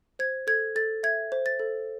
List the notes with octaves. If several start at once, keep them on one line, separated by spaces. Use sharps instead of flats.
C5 G#6
A4 G#6
A4 A6
E5 G#6
C5
A6
A4